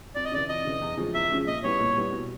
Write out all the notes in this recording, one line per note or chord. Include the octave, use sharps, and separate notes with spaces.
F2 D5
D#5
C#3 E3 D5
F2 D#5
C#3 E3
E2
C#3 F3 G#3 C#4
E2 E5
C#3 F3 G#3 C#4
A#2 D#5
G3 B3 E4 C#5
A#2
G3 B3 E4
B2